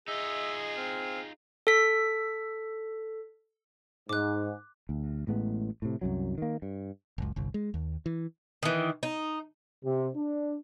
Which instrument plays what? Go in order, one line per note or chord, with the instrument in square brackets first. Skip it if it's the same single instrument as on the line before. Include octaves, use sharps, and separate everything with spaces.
[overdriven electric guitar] D#4 F4 [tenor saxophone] G#4 [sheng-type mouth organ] D#5 [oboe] E5
[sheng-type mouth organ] C4 [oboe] F5
[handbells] A4 B6
[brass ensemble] G#2 [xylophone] D6 F#6
[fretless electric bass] D2
A1 A2 G#3 B3
A2 C3
C2 F#2 F#3
D#3 A#3
G2
[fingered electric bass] F#1 C#2
G1 C2
G#3
D#2
E3
[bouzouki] D#3 E3
D#4
[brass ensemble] C3
D4